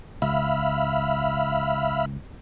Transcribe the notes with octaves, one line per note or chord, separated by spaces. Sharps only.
C#2 E5 F5 B5